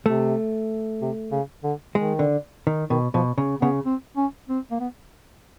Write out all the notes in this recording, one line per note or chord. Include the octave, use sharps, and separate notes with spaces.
C3 A3
C3
C#3
D3
D#3 G#3
D3
D#3
B2 D#3
B2 F3
C#3
C#3 B3
C4
C#4
C4
A#3
B3